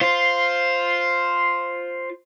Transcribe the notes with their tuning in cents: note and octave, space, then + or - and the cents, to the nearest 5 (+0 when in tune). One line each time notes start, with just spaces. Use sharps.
F4 +0 C5 +0